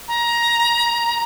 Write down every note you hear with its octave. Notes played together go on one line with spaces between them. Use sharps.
A#5